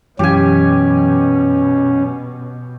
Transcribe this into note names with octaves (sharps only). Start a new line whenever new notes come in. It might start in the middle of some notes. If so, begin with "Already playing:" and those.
F#2 B2 E3 F#3 C#4 G4 G#5